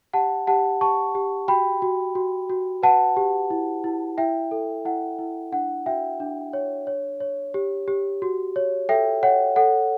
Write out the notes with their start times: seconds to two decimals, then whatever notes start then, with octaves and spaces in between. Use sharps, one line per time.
0.13 G4 F#5 A5
0.47 G4 F#5 A5
0.81 G4 A5 C#6
1.15 G4
1.48 F#4 G5 B5
1.82 F#4
2.15 F#4
2.50 F#4
2.83 B4 F#5 A5
3.17 G4
3.50 E4
3.84 E4
4.18 E4 E5 G5
4.51 A4
4.85 E4 F#5
5.19 E4
5.52 D4 F#5
5.86 F#4 E5 G5
6.20 D4
6.53 C#5
6.87 C#5
7.20 C#5
7.54 G4
7.88 G4
8.22 F#4
8.56 C#5
8.89 A4 E5 G5
9.23 C#5 F#5
9.56 A4 F#5